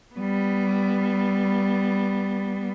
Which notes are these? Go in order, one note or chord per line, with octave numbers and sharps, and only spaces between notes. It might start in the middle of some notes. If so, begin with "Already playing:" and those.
G3 B3